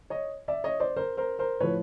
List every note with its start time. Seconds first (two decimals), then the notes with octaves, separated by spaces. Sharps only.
0.10 C#5 D#5
0.48 D5 E5
0.64 C#5 D#5
0.80 C5 D5
0.96 A#4 C5
1.17 A#4 C5
1.39 A#4 C5
1.60 A2 F3 B4 C#5